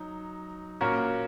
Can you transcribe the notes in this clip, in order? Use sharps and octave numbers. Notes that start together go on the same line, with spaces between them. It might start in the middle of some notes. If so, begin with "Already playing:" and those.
Already playing: F#3 D#4
A#2 A#3 C#4 F#4 A#4